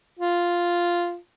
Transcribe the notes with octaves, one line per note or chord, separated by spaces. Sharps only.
F4